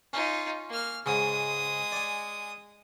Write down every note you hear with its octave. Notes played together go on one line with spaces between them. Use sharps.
C#4 D#4 F4
A#3 F6
G#2 C#3 G#3 D#6
D5 G#5